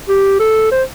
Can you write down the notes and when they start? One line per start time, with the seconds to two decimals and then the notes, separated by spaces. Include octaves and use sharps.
0.09 G4
0.40 A4
0.72 C5